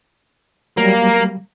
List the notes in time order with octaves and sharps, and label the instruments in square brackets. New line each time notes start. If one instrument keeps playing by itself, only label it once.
[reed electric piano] F#3 G3 [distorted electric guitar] A#3